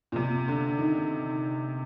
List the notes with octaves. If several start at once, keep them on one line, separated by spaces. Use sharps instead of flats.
A#2
C3
D3
D#3